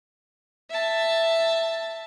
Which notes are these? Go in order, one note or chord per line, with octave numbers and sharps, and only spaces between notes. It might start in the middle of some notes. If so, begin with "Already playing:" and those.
E5 A5